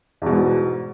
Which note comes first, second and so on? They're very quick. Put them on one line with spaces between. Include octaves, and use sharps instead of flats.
E2 B2 G#2